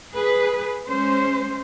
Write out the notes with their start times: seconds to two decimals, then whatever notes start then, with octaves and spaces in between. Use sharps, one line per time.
0.14 G#4 B4
0.87 G#3 C#4 C5